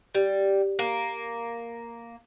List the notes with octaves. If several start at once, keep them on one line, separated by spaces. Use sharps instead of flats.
G3
A#3